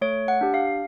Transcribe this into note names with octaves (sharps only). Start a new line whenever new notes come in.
A3 C#5
F#5
D4 G4
F5